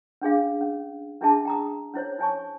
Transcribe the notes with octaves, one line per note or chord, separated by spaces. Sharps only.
C#4 D4 G#4 F5
C#4
C#4 D4 E4 G#4 E5 A5
G5 A#5 D#6
C#4 E4 C5 C#5
E4 C#5 G#5 A5 C#6